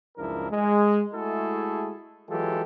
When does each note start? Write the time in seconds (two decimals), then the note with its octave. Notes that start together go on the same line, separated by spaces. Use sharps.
0.17 C#2 F#2 F3 D4 E4 A#4
0.51 G#3
1.14 G#3 A3 E4 F#4 G#4 A4
2.29 E3 F#3 G#3 F4 G4 A4